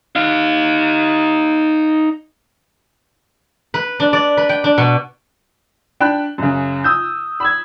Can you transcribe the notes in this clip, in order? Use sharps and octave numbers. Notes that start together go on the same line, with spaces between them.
D#4 F5
B4
D4
D5
B4
G5
D4
B2
D4 G5 B5 F#6
F#2 C#3
D#6 E6 G6
B5 E6 G#6